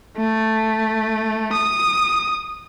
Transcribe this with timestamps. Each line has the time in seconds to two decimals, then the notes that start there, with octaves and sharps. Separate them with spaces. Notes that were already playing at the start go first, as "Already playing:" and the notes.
0.17 A3
1.52 D#6